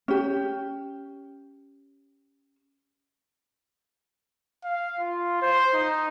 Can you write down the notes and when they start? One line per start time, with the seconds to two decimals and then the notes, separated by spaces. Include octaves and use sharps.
0.08 C#4 G4
4.64 F5
4.99 F4
5.42 C5
5.73 D#4